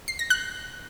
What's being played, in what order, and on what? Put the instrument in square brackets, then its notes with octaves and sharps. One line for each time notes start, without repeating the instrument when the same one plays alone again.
[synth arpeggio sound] C7
A#6
F#6